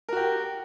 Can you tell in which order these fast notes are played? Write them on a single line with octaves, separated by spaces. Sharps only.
A#4 F#4 G4